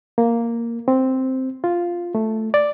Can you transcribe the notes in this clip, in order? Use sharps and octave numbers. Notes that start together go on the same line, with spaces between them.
A#3
C4
F4
A3
D5